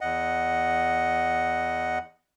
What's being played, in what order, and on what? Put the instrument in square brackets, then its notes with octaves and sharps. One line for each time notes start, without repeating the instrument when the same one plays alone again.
[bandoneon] E2 D#5 F#5